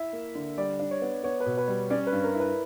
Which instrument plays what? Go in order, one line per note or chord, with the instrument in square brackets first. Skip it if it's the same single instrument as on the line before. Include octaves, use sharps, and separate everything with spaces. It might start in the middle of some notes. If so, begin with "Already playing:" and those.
Already playing: [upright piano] E4 [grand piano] E5
[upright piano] A#3
D3
[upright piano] G3 [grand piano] D5
[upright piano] D4
[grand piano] C#5
[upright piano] B3
[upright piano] B3 [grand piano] C#5
[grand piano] B4
[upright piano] B2
[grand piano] B4
[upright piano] G3
[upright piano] C#4 [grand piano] D5
[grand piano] B4
[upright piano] G2
[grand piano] A#4
[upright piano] E4
[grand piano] B4